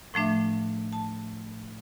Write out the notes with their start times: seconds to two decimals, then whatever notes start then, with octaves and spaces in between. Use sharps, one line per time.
0.14 A2 F3 A3 D4 E5
0.93 A5